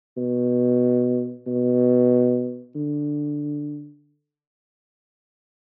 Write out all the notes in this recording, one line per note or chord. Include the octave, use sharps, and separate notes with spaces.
B2
B2
D3